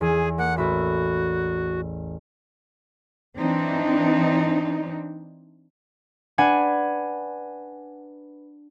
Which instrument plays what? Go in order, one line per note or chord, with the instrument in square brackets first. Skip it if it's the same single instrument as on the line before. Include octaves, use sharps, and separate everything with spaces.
[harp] E2 [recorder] G#4
[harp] A#3 [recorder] F#5
[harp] A1 E5 B5 [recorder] F#4
[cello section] E3 C4 D4 D#4
[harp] D4 B4 F#5 G#5